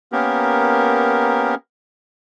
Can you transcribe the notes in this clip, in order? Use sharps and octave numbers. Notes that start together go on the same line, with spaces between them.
A#3 B3 C#4 G4 A#4